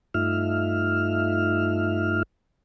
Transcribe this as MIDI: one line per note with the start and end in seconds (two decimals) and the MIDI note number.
0.14 2.23 43
0.14 2.23 57
0.14 2.23 63
0.14 2.23 65
0.14 2.23 76
0.14 2.23 89